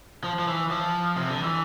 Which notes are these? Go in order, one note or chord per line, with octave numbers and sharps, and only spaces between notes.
F3
F3
E3
F3
C3
D3
E3